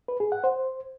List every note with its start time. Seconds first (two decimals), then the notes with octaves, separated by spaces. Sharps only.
0.08 B4
0.20 G#4
0.32 F#5
0.44 C5